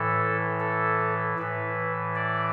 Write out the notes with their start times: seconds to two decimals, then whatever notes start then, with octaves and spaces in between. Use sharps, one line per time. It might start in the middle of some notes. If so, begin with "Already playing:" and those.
Already playing: A2 E3 A4
0.60 A4
1.39 A2 E3 B4
2.16 D5